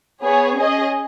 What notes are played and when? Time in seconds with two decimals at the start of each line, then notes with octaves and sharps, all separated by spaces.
0.23 B3 G#4 C#5
0.55 C#4 G#4 D#5